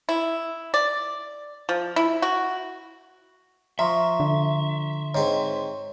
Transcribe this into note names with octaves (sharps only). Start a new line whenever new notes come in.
E4
D5
F3
E4
F#4
F3 E5 A#5 C6 C#6
D3
G#2 C4 C#5